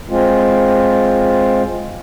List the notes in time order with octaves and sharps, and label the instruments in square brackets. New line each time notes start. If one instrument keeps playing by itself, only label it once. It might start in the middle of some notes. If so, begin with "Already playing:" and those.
[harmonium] G#3 C4 F4